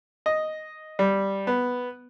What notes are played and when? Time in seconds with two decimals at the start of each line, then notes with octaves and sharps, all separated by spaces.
0.26 D#5
0.99 G3
1.47 B3